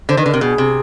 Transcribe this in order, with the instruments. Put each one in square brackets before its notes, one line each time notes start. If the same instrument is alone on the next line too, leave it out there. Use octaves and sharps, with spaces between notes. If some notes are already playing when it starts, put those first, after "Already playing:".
[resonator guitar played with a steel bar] D3 [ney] C5
[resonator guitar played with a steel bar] D#3
[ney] B4
[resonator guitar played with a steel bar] D3
[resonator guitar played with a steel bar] C3 [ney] A#4
[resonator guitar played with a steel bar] B2 [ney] G#4
[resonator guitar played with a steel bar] C3